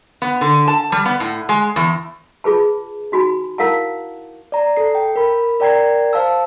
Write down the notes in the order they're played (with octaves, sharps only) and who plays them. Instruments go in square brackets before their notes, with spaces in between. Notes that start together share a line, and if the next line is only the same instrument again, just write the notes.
[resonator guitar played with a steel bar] B3
D3
A5
G3
B3
A2
G#3
E2
[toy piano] F4 G#4 B4 A5
D#4 F#4 G#5 B5
E4 A#4 F5 F#5 A5
[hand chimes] D5 A#5
A4 C7
G5
A#4 B5
A#4 D5 G5 A#5 G#6 C7
C5 F5 A5 E6